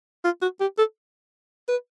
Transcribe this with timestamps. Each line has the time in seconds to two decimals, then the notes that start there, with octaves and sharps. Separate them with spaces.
0.24 F4
0.42 F#4
0.61 G4
0.78 A4
1.69 B4